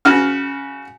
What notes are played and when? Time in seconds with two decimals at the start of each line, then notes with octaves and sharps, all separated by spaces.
0.05 C#3 F#4 F6